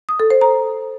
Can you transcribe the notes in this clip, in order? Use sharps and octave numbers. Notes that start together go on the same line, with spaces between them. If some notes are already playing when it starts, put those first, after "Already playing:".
D#6
A4
C5
A#5